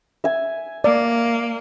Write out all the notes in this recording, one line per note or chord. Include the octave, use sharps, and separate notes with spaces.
E5 G#5
A#3 D5